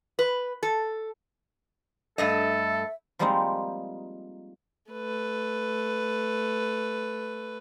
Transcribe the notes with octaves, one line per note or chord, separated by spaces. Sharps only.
B4
A4
G2 A3 A4 D#5 E5
F3 G3 G#3 A#3 C4 D#4
A3 B4